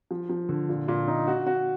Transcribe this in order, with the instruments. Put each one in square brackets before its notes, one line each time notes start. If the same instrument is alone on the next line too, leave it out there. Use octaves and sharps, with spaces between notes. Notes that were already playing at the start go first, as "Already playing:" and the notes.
[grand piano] F3
F3
D3
A#2
A#2
D#4
F#4
F#4